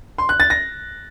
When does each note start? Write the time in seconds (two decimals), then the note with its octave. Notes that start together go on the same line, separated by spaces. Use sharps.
0.18 C6
0.29 F#6
0.40 A6
0.50 A#6